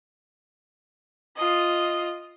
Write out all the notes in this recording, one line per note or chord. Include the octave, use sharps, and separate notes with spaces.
F4 D#5